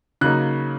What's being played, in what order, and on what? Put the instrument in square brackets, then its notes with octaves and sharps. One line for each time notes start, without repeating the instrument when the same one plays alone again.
[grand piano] C#3 F#3 A#3 D#4 F#6